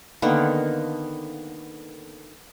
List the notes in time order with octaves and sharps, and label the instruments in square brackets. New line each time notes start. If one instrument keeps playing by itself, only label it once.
[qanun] D3 D#3 A#3 B3